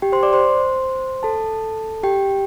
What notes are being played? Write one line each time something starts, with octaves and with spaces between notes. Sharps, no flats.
G4 G5
C5 C6
D5 D6
C5 C6
A4 A5
G4 G5